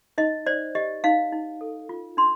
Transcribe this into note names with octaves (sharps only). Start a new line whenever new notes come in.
D#4 D#5
C5 D5
G4 D#5
D#4 F5
D#4
A4
F4
D4 C6